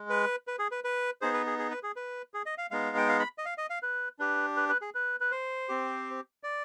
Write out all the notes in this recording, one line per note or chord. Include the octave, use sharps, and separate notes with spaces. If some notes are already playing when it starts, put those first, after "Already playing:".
Already playing: G#3
B4
B4
G#4
B4
B4
B3 D#4 G#4 C5
B4
G#4
G#4
B4
G#4
B4
G#4
D#5
F5
G#3 B3 D#4 F5
G5
F5
B5
D#5
F5
D#5
F5
B4
D4 G4 B4
B4
B4
G#4
B4
B4
C5
C4 G4
D5